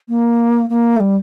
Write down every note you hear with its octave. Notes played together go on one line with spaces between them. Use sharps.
A#3
A#3
A3
G3